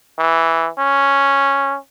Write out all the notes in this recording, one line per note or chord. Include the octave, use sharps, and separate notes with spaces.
E3
C#4